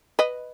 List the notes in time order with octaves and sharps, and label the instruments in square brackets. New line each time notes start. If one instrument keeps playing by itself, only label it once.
[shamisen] B4 D#5